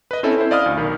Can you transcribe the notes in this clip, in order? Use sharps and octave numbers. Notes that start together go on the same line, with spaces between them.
B4 D#5
C4 C#4 E4 A4
E4 C5
D5 D#5 F5 B5 D#6 F6
D2
B1 D#3